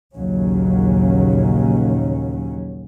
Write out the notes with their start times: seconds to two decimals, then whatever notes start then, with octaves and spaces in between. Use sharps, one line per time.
0.13 A#1 D#2 C#3 F#3 C#4